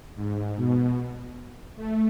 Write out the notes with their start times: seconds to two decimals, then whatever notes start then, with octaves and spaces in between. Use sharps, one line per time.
0.16 G#2
0.56 B2
1.76 A3